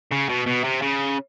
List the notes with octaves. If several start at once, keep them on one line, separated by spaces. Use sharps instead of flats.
C#3
B2
B2
C3
C#3